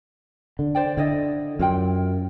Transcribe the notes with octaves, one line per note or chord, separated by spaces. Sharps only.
D3
C5 D5 G5
D3 E4 D5 D#5
F#2 E4 F4 G5